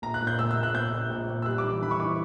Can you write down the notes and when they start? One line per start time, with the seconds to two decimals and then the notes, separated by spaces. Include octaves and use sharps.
0.02 A#1 A#5
0.14 F#6
0.21 A#2
0.27 G6
0.39 A#1 E6
0.51 E6
0.57 A#1
0.63 F#6
0.75 A#1 G6
0.92 A#1
1.10 A#1
1.28 A#1
1.42 E6
1.46 G3 F#6
1.58 D6
1.64 E3
1.82 E3 B5
1.91 C#6
2.00 E3 D6